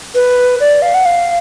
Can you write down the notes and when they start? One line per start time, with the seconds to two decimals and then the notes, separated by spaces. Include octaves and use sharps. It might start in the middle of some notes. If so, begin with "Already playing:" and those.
0.15 B4
0.60 D5
0.82 F5
0.94 F#5
1.06 F5